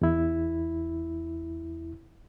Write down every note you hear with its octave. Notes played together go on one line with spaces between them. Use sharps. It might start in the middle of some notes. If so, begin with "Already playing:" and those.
E2 E4